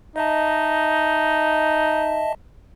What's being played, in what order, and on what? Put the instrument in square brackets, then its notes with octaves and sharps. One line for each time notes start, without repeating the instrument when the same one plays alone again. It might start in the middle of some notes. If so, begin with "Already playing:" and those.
[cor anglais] D#4 [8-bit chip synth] D#5 E5 A5